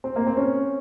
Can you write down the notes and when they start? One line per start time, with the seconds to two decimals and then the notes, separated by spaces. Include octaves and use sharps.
0.04 C4
0.16 A#3
0.27 C4
0.37 C#4